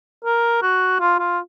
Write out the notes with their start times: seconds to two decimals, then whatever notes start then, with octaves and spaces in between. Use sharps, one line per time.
0.24 A#4
0.62 F#4
1.00 F4
1.19 F4